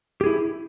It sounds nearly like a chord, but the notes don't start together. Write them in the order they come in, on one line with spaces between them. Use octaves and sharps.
G4 G#4 E4